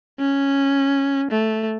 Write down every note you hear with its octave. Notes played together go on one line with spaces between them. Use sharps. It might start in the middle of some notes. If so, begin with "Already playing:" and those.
C#4
A3